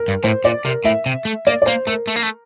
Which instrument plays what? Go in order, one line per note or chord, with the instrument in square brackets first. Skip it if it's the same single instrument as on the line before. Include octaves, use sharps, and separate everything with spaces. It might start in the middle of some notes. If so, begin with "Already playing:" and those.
Already playing: [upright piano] A#4
[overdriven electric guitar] G2
[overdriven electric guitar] A2 [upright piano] C5
[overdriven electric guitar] A#2 [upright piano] D5
[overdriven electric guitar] C3 [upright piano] A#4
[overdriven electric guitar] A2 [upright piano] E5
[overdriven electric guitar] C3
A3
[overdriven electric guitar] A#3 [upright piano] D5
[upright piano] D5
[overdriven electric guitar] A#3 [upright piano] C5
[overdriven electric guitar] A3 [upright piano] A#4
[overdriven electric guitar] A3
A#3
A3